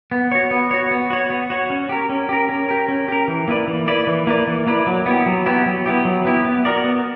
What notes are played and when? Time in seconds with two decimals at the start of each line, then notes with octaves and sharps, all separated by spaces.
0.11 B3
0.32 F#4 C#5
0.51 B3
0.71 F#4 C#5
0.91 B3
1.10 F#4 C#5
1.30 B3
1.50 F#4 C#5
1.70 C#4
1.89 G4 A#4
2.09 C#4
2.29 G4 A#4
2.49 C#4
2.69 G4 A#4
2.88 C#4
3.08 G4 A#4
3.28 E3
3.48 A#3 E4 B4 D5
3.68 E3
3.87 A#3 E4 B4 D5
4.07 E3
4.27 A#3 E4 B4 D5
4.47 E3
4.67 A#3 E4 B4 D5
4.87 F#3
5.06 B3 E4 G4
5.26 F#3
5.46 B3 E4 G4
5.66 F#3
5.86 B3 E4 G4
6.05 F#3
6.25 B3 E4 G4
6.45 B3
6.65 F#4 A#4 D5
6.84 B3